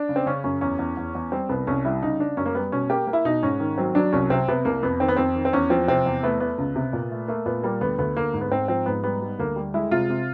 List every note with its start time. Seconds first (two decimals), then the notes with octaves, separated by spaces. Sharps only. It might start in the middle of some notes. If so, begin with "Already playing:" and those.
Already playing: D4
0.09 C#3
0.16 C4
0.26 C#3 C#4
0.44 F#2 C#4
0.61 E2 C#4
0.79 E2
0.97 E2
1.15 E2
1.32 G3 C4
1.49 C2 B3
1.67 C2 C#4
1.85 G3 E4
2.02 C#3 D#4
2.19 C#3 D4
2.37 F#2 C#4
2.46 A#3
2.55 G3 B3
2.72 B2 C#4
2.90 A#3 G4
3.07 A#3
3.13 E4
3.25 B2 D#4
3.43 G#2 C#4
3.60 D#3
3.78 F#3 C4
3.95 F#3 D4
4.13 C2 C#4
4.30 C3 C4
4.48 C3 B3
4.65 C2 A#3
4.83 F2 B3
5.00 D#3 C4
5.08 B3
5.16 F2 C4
5.35 D#3
5.45 C4
5.53 E2 C#4
5.70 F3 C4
5.88 C3 C4
6.06 E2
6.23 A3 B3
6.40 A3 B3
6.58 C#2
6.76 C3
6.93 A#2
7.11 A3
7.28 A3 A#3
7.46 A#2 B3
7.63 G3 A#3
7.81 D2 B3
7.98 D2 B3
8.17 D2 A#3
8.33 G#2
8.41 B3
8.51 G#2 C4
8.68 F3 C4
8.86 G#2 B3
9.04 G3 B3
9.21 G3
9.39 D2 A#3
9.56 G3
9.74 G#3 E4
9.91 C3 F4
10.10 C3